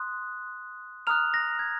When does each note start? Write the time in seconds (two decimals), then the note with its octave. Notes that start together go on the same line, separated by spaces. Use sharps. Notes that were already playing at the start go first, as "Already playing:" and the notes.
Already playing: C6 D#6 F#6
1.07 A#5 D#6 F6 F#6 F7
1.34 A#6
1.59 G#6